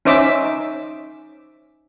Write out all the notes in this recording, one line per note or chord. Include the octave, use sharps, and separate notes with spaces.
C#4 D#4 C5 E5 D6 E6